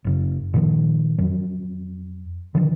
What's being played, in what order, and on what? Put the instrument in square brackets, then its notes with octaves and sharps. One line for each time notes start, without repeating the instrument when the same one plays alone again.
[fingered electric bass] F#1 F#2 C#3
A#2 D#3 F3
F2 F#3
D3 D#3 F3